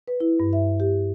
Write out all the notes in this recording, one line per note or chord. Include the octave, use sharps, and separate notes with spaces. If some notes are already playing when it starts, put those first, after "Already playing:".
B4
E4
G2
E5
G4